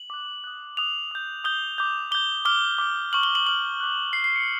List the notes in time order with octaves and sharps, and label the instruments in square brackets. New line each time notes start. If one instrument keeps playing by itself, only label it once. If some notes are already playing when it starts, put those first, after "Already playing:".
Already playing: [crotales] F#7
D6 F#6
D#6 F#6
D#6 F#6 F7
D#6 G6
D#6 G6 G7
D6 G6
D6 G6 G7
D6 F6 G7
D6 F6
C#6 F6 F#7
G7
F#7
C#6 F6 F#7
D6 F#6
D6 F#6 C7
C7
C#7